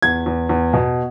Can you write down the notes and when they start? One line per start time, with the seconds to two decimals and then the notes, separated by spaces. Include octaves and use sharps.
0.02 E2 G#6
0.26 E2
0.49 E2
0.73 B2